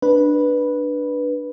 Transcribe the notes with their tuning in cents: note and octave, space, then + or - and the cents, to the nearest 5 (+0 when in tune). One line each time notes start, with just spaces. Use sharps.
D4 +10 B4 -10